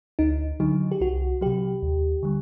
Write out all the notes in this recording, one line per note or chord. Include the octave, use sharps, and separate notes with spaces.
D2 D#4
D3 F#3 D#4
G4
C2 F#4
C3 F#3 G4
D#2
D3 G3